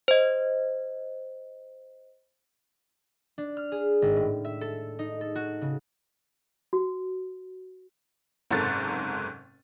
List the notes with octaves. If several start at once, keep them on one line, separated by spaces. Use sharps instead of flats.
C5 D#5
D4
F6
G#4
G#1
A2
E5
A4
D#4
A4
F#4
C#3
F#4
F#1 G#2 C3 A4 A#4 A6